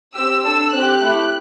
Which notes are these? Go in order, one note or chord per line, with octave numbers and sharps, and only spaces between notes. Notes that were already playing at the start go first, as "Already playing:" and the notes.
C4 G4 E6
D4 A4 E6
C4 G4 F#6
A3 E4 G4